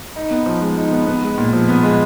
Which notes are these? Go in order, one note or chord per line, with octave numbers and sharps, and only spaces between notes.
D#4
B3
F3
G#3
D#4
B3
B3
G#3
A#2
F3
B3
G#3